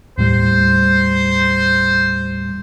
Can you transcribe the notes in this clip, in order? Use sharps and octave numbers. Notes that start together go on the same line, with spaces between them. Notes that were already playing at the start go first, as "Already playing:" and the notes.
D#2 A2 G3 C5